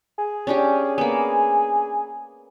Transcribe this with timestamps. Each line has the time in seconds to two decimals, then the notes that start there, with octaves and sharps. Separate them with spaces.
0.18 G#4
0.47 C#4 D4 G4
0.98 A#3 B3